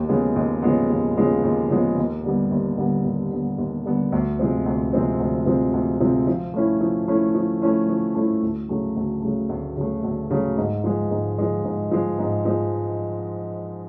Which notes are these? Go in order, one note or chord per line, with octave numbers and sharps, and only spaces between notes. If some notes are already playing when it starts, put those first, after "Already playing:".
Already playing: D#2
C#3 F3 G#3 B3
D#2
C#3 F3 G#3 B3
D#2
C#3 F3 G#3 B3
D#2
C#3 F3 G#3 B3
D#2
D3 G3 B3
D#2
D3 G3 B3
D#2
D3 G3 B3
D#2
D3 G3 B3
D2
C3 F3 G#3 C4
D2
C3 F3 G#3 C4
D2
C3 F3 G#3 C4
D2
C3 F3 G#3 C4
F3
A3 C#4 E4
F3
A3 C#4 E4
F3
A3 C#4 E4
F3
A3 C#4 E4
D2
C#3 F#3 A3
D2
C#3 F#3 A3
D2
C#3 F#3 A3
D2
C#3 F#3 A3
G#2
F3 G#3
G#2
F3 G#3
G#2
F3 G#3
G#2
F3 G#3